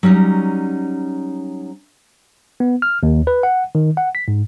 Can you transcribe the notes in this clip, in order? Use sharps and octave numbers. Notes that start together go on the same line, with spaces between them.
F#3 G3 C#4 D#4
B3
F6
D#2
B4
F#5
D#3
F#5
B6
G#2